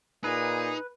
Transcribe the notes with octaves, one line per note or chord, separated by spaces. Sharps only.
A#2 D#4 G#4 B4